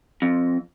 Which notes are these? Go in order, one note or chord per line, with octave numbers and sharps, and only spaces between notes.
F2